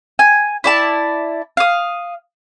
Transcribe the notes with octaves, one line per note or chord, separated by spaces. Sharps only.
G#5
E4 D5 A5
F5 D#6